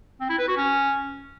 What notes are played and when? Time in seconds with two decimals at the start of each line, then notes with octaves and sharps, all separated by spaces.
0.21 C4
0.30 E4
0.39 B4
0.48 F#4
0.57 C#4